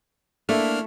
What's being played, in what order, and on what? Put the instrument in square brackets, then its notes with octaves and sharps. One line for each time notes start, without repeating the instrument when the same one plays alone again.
[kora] A3 E4 [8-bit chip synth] A#3 D4 F6